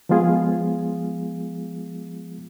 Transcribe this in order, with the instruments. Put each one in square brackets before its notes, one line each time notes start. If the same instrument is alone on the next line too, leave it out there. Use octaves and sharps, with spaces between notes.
[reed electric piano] F3 G#3 B3 F4 G#4